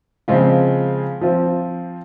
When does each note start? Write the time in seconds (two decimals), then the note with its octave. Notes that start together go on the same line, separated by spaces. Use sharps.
0.28 C#3 F3 G#3 C4 F4
1.21 F3 C4 F4